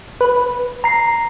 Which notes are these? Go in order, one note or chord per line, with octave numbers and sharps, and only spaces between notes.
B4
A#5 C7